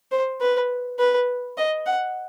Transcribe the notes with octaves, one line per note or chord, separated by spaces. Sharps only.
C5
B4
B4
D#5
F#5